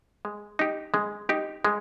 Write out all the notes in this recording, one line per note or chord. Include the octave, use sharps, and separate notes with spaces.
G#3
D#4 G4
G#3
D#4 G4
G#3